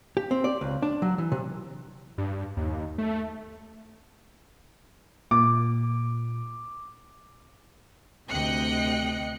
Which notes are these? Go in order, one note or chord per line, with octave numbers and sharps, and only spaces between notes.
G4
C4
D5
C#2
D4
F#3
E3
C3
G2
D#2
A3
A#2 D6
D2 C3 D#5 G5 F#6 C#7